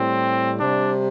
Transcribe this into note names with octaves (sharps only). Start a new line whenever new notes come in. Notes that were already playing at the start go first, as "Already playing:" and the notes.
Already playing: A2 G3 C4
C3 G3 D4